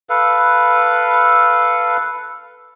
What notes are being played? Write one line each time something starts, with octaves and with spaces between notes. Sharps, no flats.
A4 B4 F5